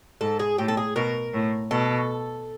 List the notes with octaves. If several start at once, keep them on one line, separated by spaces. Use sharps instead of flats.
G#2 A4
G#4
A2 G4
A4
G#4
B2 A#4
A2
B2 A4